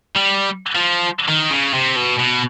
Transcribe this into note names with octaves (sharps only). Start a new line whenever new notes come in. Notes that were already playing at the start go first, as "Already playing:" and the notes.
G3
F3
D#3
C#3
C3
B2
B2